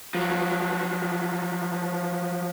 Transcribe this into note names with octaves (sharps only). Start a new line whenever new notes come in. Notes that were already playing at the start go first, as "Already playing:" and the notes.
F3 F#3